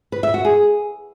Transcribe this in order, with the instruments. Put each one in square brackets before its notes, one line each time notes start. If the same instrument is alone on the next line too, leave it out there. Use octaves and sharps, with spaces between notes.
[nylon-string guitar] B4
E5
F#4
G#4